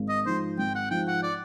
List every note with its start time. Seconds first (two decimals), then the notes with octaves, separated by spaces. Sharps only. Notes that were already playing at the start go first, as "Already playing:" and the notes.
Already playing: G#1
0.09 D#5
0.25 G#2 F3 C5
0.58 G#1 G5
0.75 F#5
0.91 G#2 F3 G5
1.07 F#5
1.23 D5